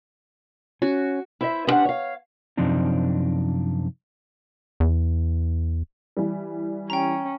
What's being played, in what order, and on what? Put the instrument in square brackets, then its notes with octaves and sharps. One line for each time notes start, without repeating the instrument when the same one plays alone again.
[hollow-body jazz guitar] C#4 [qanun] F#4
[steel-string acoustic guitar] E4 C5 E5
B3 C#4 D4 G4 C5 F#5
C#5 F5
[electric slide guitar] F#2 C3 F3 C4 D4 D#4
[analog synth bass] E2
[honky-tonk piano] E3 G3
[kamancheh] C#4 [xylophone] G5 A#5